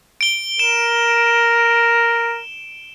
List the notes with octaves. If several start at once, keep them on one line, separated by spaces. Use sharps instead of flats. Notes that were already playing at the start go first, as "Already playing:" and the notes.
D7 G7
A#4 E7